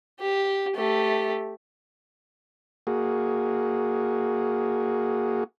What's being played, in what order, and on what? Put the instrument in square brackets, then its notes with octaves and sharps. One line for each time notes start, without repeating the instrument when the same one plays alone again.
[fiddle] G4
A3 G4
[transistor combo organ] A#3 F#4 G#4